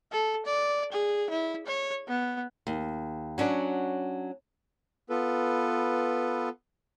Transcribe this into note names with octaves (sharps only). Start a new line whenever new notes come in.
A4
D5
G#4
E4
C#5
B3
D#2
F#3 C#4 D4 F#4
B3 F4 A4 B4